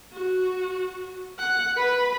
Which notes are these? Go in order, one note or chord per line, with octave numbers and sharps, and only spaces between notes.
F#4
F#5
B4 B5